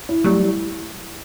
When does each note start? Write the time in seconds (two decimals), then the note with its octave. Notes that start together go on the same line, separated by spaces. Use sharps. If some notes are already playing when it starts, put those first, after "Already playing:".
0.09 E4
0.24 F#3 G3 A3
0.40 E4